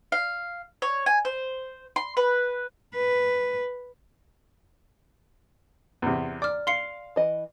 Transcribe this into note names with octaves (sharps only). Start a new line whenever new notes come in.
F5
C#5
G#5
C5
C6
B4
B4
E2 C3
D5 D6 F6
F5 C6 C7 C#7
E3 D#5